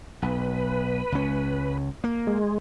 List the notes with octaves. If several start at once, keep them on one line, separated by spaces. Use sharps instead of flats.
B1 B4
C#2 C#4
A#3
G#3